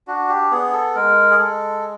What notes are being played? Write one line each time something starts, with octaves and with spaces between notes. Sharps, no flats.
D4 F#4
G4
B3 G#4
A4
G#3 A#4
G#4
G#3 A4